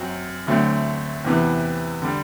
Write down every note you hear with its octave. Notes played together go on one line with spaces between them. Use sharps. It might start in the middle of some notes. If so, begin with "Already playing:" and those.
Already playing: F#2 F#3 C4 F#4
D2 D3 F#3 A3 C4
E2 C3 E3 B3
D3 G3